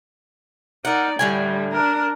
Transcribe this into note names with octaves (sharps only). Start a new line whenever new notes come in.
D#4 A#4 D5 F#5
A2 D3 G3 G#5
D4 A#4